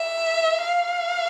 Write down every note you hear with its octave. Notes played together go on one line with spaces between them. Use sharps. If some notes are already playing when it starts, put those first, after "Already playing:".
Already playing: E5
F5